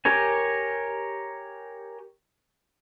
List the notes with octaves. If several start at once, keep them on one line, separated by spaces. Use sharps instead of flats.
G4 A#4 C#5 G#5